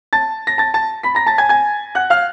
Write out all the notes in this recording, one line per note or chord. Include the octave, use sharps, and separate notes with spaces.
A5 A6
A#6
A5 A6
A5 A6
B5 B6
A#5 A#6
A5 A6
G#5 G#6
G#5 G#6
F#5 F#6
F5 F6